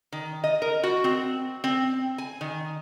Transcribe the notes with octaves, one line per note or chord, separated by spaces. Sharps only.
D#3
D#5
A#4
F#4
C4
C4
G#5
D#3